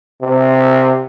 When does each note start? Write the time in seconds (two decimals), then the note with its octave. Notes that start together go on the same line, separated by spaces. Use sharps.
0.22 C3